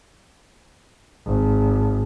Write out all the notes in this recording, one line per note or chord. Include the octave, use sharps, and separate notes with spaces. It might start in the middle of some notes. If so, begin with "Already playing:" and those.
G#1